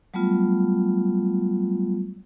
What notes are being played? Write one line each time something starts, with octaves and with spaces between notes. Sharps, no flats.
F#3 G3 A3 B3 F4